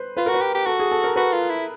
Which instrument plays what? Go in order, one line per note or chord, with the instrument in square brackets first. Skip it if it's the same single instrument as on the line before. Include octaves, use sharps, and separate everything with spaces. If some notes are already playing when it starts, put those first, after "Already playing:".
Already playing: [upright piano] B4 C5
[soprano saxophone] F4 [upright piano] B4
[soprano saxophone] F#4 [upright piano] A#4
[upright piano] B4
[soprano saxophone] G4
G4
[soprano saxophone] F#4 [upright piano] A4
[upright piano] G#4
A4
A#4
[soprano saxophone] F#4 [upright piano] B4
[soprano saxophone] F4
E4